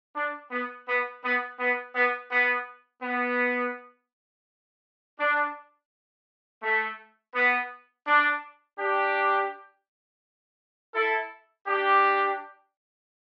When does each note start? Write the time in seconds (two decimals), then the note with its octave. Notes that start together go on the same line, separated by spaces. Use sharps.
0.15 D4
0.51 B3
0.87 B3
1.24 B3
1.59 B3
1.95 B3
2.31 B3
3.02 B3
5.19 D4
6.63 A3
7.35 B3
8.07 D4
8.79 D4 G4
10.94 E4 A4
11.67 D4 G4